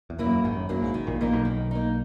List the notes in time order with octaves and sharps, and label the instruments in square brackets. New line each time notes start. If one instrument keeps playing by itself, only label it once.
[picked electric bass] E2
[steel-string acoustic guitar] F#3 A#3 E4
[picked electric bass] F#2
[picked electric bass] G#1 G#2 [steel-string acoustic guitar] D#3
[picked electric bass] F#2
[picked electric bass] F#2 [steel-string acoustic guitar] F#3 A#3 E4
[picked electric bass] G#1 G#2
[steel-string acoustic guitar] D#3
[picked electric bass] A#1 A#2
[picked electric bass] A#1 A#2 [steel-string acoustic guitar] A#3 D#4
[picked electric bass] B1 B2
[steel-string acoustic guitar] D#3
A#3 D#4